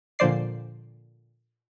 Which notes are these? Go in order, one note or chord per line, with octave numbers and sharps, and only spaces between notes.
A#2 D3 F3 C5 D5 C7